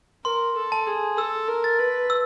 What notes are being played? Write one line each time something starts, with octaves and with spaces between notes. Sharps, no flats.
A#4 C6
A4
A5
G#4
A4 E6
A#4
A6
B4
E6